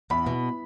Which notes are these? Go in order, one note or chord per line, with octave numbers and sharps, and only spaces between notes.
E2 B5
B2